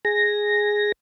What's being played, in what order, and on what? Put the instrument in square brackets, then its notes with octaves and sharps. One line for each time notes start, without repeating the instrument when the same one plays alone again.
[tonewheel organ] G#4 A#6